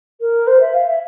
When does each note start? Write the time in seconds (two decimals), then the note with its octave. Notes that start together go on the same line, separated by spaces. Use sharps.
0.20 A#4
0.47 C5
0.60 E5
0.74 F5
0.87 E5